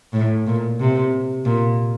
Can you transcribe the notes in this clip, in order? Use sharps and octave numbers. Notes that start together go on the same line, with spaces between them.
A2
A#2
C3
A#2